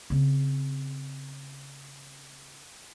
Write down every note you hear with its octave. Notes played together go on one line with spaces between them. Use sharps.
C#3 C4